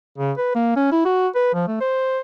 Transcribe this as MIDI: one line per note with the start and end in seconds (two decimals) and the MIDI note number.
0.18 0.32 49
0.38 0.53 71
0.55 0.74 58
0.76 0.91 61
0.92 1.04 64
1.05 1.28 66
1.35 1.50 71
1.53 1.66 53
1.68 1.80 57
1.81 2.20 72